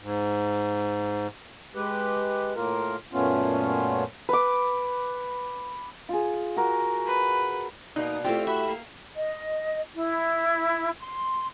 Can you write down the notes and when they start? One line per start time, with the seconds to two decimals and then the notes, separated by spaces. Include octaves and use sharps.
0.02 G#2
1.75 G#3 G4 B4
2.56 A2 A#3 F4 A#4
3.13 F#2 A#2 A3 B3 C#4 F4
4.29 B4 D6
6.09 F4 G#4
6.56 F#4 A#4
7.06 B4
7.96 B2 A#3 D#4 D5
8.24 A3 C4 E4 F4 G4
8.47 F#4 E5 B5
8.68 A#3
9.16 D#5
9.96 E4
11.00 C6